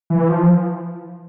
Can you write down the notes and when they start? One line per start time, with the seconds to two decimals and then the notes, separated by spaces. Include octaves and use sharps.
0.10 E3
0.29 F3